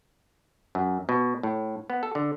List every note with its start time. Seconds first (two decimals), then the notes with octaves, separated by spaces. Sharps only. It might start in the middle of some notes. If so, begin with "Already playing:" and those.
0.75 F#2
1.09 B2
1.43 A2
1.90 B3
2.03 A4
2.15 D3